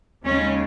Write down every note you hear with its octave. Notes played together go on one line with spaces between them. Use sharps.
D#2 C#3 G#3 C#4